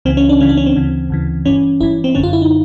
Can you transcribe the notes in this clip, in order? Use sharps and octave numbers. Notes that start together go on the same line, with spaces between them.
C#2 C#3 E3 C4
C#4
D4
C#2 C#3 E3 C#4
D4
C#4
C4
D2 C#3 E3
D2 C#3 E3
G1 G2 E3 C#4
G1 G2 E3 E4
C4
G1 F#2 D3 C#4
F4
E4
D#4